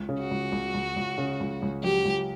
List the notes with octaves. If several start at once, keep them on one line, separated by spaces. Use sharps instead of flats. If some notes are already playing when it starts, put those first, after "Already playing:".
Already playing: C#2
C#3
F#4
C#2
C#2
C#2
C#2
C#3
C#2
C#2
F#3 G4
C#2